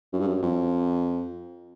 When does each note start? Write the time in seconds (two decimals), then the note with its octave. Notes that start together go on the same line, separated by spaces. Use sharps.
0.13 F#2
0.20 G2
0.27 F#2
0.42 F2